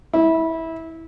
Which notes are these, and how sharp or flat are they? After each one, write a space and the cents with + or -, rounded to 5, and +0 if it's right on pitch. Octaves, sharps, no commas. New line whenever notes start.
E4 -20